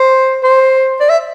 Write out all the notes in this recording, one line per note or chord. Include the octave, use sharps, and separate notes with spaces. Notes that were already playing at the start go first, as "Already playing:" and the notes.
Already playing: C5
C5
D5
E5